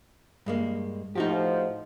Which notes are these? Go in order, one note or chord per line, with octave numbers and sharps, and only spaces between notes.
G2 G#3 A#3
A2 F3 D#4 F#4 G4